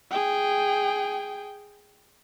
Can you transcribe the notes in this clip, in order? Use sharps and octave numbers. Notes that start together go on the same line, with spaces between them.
G#4 G5